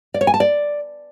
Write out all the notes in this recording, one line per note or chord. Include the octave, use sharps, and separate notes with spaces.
D5
C#5
G#5
A5
D5